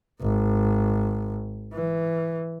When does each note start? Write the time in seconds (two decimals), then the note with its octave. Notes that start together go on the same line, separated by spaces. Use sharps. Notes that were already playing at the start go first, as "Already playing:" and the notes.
0.22 G#1
1.73 E3